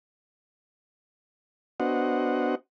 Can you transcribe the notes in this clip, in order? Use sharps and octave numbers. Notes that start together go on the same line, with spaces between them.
B3 D4 F#4 C5 D#5 F#5